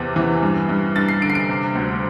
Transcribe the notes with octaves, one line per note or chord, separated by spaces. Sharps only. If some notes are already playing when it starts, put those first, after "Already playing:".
Already playing: E2 C3 E3 A6
E3
G2
G2
G2 A6
C7
D3 D7
C7
D7
C3
D2